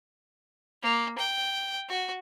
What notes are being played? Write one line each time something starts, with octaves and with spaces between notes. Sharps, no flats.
A#3
G5
F#4